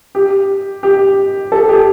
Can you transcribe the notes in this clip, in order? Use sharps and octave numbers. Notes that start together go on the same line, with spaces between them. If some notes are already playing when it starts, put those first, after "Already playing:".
G4
G4
A4
G4